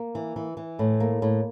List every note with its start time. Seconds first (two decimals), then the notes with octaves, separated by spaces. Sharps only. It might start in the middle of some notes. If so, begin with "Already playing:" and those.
Already playing: A#3
0.15 E3
0.36 E3
0.57 E3
0.79 A2
1.00 A#3
1.22 A2